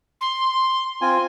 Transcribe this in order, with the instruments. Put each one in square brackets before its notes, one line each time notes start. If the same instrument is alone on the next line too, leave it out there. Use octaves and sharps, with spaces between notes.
[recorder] C6
[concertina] C4 F4 G#5